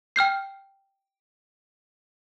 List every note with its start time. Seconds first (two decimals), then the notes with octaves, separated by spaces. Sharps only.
0.16 G5 F6 G6 C7